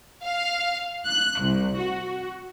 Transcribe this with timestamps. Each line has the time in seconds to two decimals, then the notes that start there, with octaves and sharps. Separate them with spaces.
0.23 F5
1.06 F#6
1.42 C2
1.77 F#4